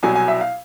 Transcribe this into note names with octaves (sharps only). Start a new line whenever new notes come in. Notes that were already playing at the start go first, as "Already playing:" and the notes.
C2 B2 F#3 G#5
G#5
E5
F5